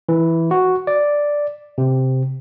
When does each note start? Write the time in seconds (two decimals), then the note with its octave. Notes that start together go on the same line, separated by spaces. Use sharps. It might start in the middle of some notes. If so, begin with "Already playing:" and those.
0.09 E3
0.51 F#4
0.87 D5
1.78 C3